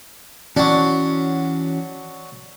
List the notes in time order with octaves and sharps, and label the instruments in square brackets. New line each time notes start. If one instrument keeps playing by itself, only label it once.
[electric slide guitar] E3 C#4 F#4 [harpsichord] F#3 D4